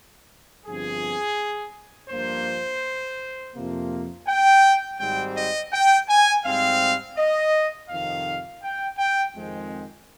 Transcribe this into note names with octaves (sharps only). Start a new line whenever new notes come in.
G1 G2 F3 C4 G#4
G2 F3 A#3 C5
F2 C3 F3 A#3
G5
G#1 G#2 G3 C4 G5
D#5
G5
G#5
G#2 G3 C4 F5
D#5
F2 C3 D#3 F5
G5
G5
F2 D#3 G#3 C4